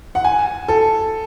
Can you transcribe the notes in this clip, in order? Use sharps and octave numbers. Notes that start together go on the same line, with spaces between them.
F#5
G#5
A4